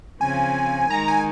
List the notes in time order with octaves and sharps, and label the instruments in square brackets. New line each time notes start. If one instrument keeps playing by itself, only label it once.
[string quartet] C#3 F3 C4 [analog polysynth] G#5
[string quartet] D#3 G#3 D#4 [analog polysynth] A#5
[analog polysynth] G#5